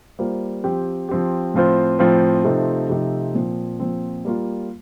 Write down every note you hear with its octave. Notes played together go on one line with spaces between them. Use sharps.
G3 A#3 F4 C5
F3 C4 G4
F3 C4 G4
A2 F3 C4 F4 C5
A2 F3 C4 F4 C5
C3 F3 A3 C4 D#4
C3 F3 A3 C4 D#4
A#2 F3 C4
A#2 F3 C4
G3 A#3 F4